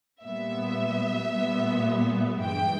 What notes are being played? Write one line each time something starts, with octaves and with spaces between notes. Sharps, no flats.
A#2 G3 B3 E5
A#2 G3 B3
G2 E3 G#3 G5